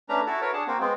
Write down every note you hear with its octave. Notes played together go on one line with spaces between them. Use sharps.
A3 C#4 D4 B4 A#5
E4 F#4 A4
F#4 A#4 B4 C#5
D4 G#4 F#5 A5
A#3 C4 F#4
G#3 B3 C4